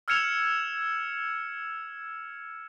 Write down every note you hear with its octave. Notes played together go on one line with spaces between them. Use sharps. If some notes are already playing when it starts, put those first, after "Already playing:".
E6 F6 G#6 C#7 E7 F7